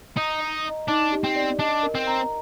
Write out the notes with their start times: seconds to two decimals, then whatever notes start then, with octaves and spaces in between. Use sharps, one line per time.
0.17 D#4 A#5
0.41 D#5
0.65 D#5
0.88 D4 D#4
1.12 G4
1.24 C4
1.36 D5
1.59 D4 D#5
1.83 A#4
1.95 C4
2.07 A#5